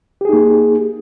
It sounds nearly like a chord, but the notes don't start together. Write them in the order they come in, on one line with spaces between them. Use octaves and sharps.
G4 G#4 D#4 A#3